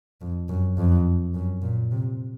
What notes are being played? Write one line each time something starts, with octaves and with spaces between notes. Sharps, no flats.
F2
F#2
F2
F#2
A#2
C3